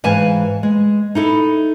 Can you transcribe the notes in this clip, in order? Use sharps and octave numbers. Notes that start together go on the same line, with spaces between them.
G#2 E3 B4 F5 G#5 A5
G#3
D#4 E4 A4